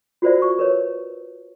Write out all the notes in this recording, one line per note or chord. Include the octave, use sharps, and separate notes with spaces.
F4 F#4 A#4 C5 D5 E5
C#6
A#4 B4 C#5